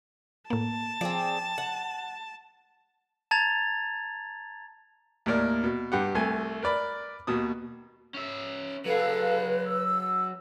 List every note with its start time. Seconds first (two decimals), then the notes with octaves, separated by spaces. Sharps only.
0.50 A2 A#3 A5
1.01 F3 C4 G#4 D5
1.58 F#5
3.31 A5 A#5 G#6 A6 F7
5.26 D#2 A2 A#4 D5
5.64 B2
5.92 G2 G4 F#5
6.15 C2 A3 G#5
6.63 A#4 B4 D5 B5
7.27 D#2 B2 D#6
8.14 C#4 E5
8.85 F#3 G#4 A4 B4 F5
9.67 E6